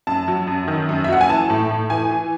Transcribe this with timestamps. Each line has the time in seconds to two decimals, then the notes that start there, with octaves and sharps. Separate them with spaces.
0.07 F#2 A5
0.28 F#3
0.47 F#2
0.68 D#3
0.89 F#2
1.04 E5
1.09 F#3 F#5
1.21 G#5
1.29 E3 A5
1.50 A2
1.71 A2
1.90 E3 G#5
2.11 E3